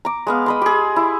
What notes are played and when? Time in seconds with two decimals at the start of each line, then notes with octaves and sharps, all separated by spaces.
0.05 A#5 D6
0.27 G#3 B3 F5
0.46 D#5 B5 C6
0.62 G4 G#4
0.96 E4